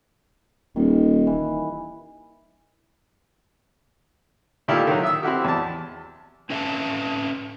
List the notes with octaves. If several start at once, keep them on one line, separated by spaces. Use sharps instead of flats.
D#1 D#3
E3
A#2 D#3 A3 E4 F4 G4
D#3 F#3
E5 D#6 E6
C4 E4 F#4 G4
E2 A5
C4 C#4 B4 E5 F5 A5